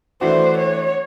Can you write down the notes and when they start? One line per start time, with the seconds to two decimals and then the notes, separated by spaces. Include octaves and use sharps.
0.21 E3 A3 D4 F#4 C5
0.58 C#5